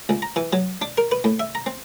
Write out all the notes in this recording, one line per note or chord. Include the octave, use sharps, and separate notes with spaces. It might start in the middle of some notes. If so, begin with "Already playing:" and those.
C#2
A#5
E3
F#3
D4
A#4
B4
A2
E5
A#5
C4